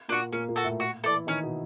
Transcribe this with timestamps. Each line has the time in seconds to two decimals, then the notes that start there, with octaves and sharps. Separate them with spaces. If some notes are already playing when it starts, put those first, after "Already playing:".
0.08 A#2 A#3 D4 F#4
0.32 A#2 A#3 C#4
0.49 A#2 A#3
0.56 F#4 A4
0.64 A2 A3
0.80 F#4
1.04 E3 E4 A4 D5
1.27 D#3 C#4 D#4
1.43 B2 B3